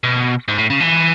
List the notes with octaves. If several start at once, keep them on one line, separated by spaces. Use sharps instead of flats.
B2
G#2
A2
C#3
E3